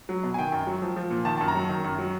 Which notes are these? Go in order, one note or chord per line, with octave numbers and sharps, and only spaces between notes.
F#3
B2
G#5
D#3 G5
F#2
F#3
F3
F3
A#2
D#3 A5
F#2 A5
A#5
F#3
D#3
F#2
F#3